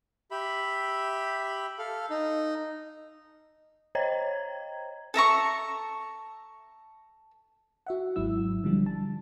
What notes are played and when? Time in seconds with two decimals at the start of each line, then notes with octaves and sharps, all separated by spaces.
0.31 G4 E5 B5
1.78 A4 F5
2.10 D#4
3.95 C5 C#5 D#5 G5 A#5 G#6
5.14 A4 E5 A#5 C#6
7.87 F#4 E5 F#5
8.16 G#1 G#2 F#3 E4 E6
8.64 D3 F3 G3 D4
8.86 A5